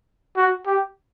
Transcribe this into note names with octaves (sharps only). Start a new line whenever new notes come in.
F#4
G4